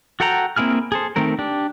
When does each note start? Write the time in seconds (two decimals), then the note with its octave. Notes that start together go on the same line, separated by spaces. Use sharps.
0.20 F#4 A4 F#5 G5 A#5
0.56 A#3 C4 E4 G#4 F6
0.92 G#4 A4 C5
1.16 D#3 A3 C4 A#4
1.39 D4 G4